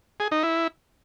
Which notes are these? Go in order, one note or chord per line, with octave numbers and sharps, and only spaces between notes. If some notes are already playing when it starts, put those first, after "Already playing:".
G#4
D#4
E4